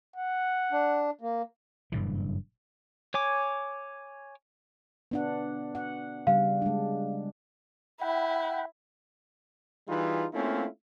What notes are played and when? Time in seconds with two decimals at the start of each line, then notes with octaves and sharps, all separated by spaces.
0.16 F#5
0.72 D4
1.21 A#3
1.92 F#1 G2 A#2 E3
3.14 C#5 G#5 D6
5.11 B3 D4 F#5
5.75 F#5
6.27 C#3 G3 F5
6.62 G#3 D4
8.01 E4 F#5 G5 B5
9.88 E3 G3 D#4 F4 G#4 B4
10.33 A3 A#3 C4 C#4 E4 F4